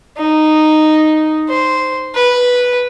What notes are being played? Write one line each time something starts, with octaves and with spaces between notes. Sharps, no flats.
D#4
C5
B4